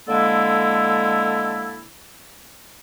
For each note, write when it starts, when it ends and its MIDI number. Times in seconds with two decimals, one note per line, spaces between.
0.09 1.85 50
0.09 1.85 56
0.09 1.85 58
0.09 1.85 64
0.09 1.85 69